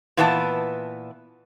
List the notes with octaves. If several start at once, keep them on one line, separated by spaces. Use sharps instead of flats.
A#2 E3 B3 E4 A#4 A5